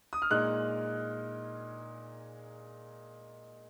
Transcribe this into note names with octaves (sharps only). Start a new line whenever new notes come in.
D#6
F6
A#2 G#3 D#4 F#6